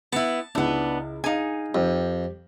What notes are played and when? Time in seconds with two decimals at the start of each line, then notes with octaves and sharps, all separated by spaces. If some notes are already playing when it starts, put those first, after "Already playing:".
0.13 B3 E4 A5
0.55 C#2 B3 D4 E4
1.24 D#4 G#4 F5 G#5
1.75 F2 G4